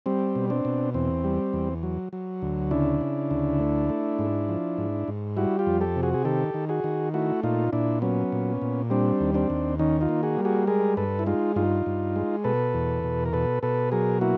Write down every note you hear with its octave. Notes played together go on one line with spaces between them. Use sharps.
G3 C4
B2
C4 D4
B2
E2 C4
G3
E2
F#3
F#3
D2
C#3 D4 E4
C#3
D2
A3
A3
G#2
F3
G#2
G#2
G3 E4 F#4
F4 G4
F2
G4 A4
C3
F#4 G#4
G#4
D#3 G4 A4
D#3
F#4 G#4
D#3
A3 E4 F#4
A#2 D#4 F4
A#2 D4 E4
F#3 B3 C#4
A#2
A#2
G3 C4 D4
D#2
C4 D4
D#2
D#3 C#4 D#4
D#4 F4
A#3
F#4 G#4
G3
F#4 G#4
G#3 G#4 A#4
G2 A4 B4
E4
G#3 D#4 F4
G2 D#4 F4
G2
G#3
B2 A4 B4
E2
B2
A#4
B2 A4 B4
B2 A4 B4
F#3 G#4 A#4
A#3 E4 F#4